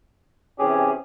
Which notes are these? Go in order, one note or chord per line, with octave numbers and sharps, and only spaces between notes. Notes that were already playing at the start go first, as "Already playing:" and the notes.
C3 E3 C#4 G4 G#4